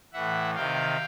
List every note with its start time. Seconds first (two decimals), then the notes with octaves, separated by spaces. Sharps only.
0.13 A2 E3 E5 F#5
0.55 C3 D#3 F5 G5